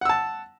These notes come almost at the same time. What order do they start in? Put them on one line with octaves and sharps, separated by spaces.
F#5 E6 A5